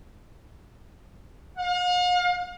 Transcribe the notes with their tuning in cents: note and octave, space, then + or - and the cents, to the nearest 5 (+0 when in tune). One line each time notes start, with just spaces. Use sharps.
F5 +45